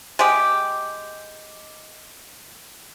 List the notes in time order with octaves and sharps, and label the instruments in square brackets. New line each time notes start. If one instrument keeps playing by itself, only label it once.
[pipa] G#3 G4